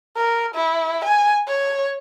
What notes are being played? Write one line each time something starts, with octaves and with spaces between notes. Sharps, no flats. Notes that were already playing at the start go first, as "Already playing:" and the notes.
A#4
E4
G#5
C#5